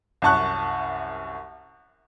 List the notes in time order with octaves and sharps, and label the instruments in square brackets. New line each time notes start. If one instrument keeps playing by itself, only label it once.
[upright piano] C2 F#2 A5 C#6 F#6